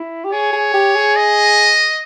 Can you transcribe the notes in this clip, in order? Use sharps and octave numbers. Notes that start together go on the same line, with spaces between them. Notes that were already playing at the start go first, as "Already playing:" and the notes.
Already playing: E4
G4
G#4 C#5
G#4
G4
G#4
D#5